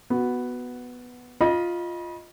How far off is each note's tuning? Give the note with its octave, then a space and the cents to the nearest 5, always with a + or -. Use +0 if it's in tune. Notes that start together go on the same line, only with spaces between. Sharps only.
B3 +0 F#4 +0
F4 +0 D#5 +0 B5 -35